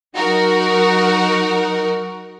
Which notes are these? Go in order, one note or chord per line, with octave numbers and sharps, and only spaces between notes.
F#3 D#4 F#4 A#4